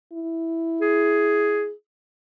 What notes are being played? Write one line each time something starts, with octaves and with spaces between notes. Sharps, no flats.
E4
G#4